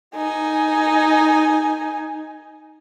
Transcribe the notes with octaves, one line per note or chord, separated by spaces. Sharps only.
D#4 G#5